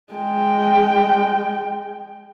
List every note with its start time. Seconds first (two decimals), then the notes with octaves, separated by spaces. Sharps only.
0.13 G#3 G5